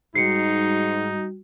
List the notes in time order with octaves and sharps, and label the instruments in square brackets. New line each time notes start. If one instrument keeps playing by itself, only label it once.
[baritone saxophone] G#2 [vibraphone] G3 F#4 [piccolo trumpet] D#4 [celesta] C7 C#7